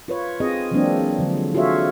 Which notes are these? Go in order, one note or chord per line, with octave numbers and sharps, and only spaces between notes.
F4 B4 C#5
C4 F4 G#4 D#5
E3 F#3 G#3 A#3 C4 D4
D3 F3 F#3
F4 F#4 G#4 A4 C#5 E5